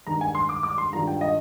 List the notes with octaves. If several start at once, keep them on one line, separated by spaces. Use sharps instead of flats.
G2 D#3 G#3 D#4 A#5
G#5
C6
D6
D6
C6
G2 D#3 G#3 D4 F4 A#5
G5
D#5